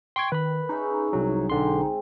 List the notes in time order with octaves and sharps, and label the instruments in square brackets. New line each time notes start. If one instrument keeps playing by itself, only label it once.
[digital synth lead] G5 [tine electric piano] C6 C#6 G#6
[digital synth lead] D#3 [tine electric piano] B4 B5
[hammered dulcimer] C#4 G#4 E5 [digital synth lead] D#4
[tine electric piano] C2 F#3
[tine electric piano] B1 D3 C6 [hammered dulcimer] G#3 C4